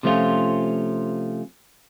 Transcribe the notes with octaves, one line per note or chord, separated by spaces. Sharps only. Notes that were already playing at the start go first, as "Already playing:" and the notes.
C3 F3 A3 C#4 F4